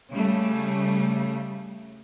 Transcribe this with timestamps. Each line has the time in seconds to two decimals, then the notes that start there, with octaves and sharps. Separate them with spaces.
0.12 C#3 G3 A3